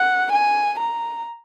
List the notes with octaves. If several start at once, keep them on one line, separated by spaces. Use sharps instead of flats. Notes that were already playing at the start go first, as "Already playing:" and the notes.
Already playing: F#5
G#5
A#5